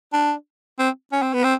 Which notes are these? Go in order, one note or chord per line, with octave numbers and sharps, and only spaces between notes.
D4
C4
C#4
C4
B3
C4